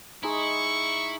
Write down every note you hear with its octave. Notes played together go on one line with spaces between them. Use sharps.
G#3 D#4 E4 C#6